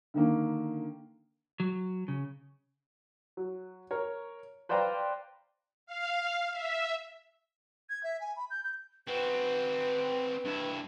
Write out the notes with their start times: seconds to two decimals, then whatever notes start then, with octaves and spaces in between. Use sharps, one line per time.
0.14 D3 D#3 A#3
1.60 F#3
2.08 C#3
3.37 F#3
3.91 A#4 C#5
4.69 B4 C5 D5 F5 G5 A#5
5.86 F5
6.52 E5
7.90 G#6
8.03 E5
8.21 G#5
8.36 B5
8.50 G6
8.64 G6
9.08 C4 F#4 B4
10.44 G2 E4